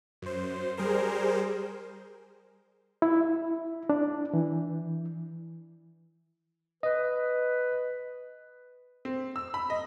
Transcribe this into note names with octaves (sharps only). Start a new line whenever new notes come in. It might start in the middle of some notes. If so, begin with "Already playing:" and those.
F#2 C5
G3 G#4 A#4 C5
E4
D4
E3
B4 D#5
C4
E6
B5
D#5